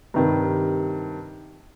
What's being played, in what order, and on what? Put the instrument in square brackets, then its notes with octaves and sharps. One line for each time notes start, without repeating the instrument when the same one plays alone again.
[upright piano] G2 C3 D#3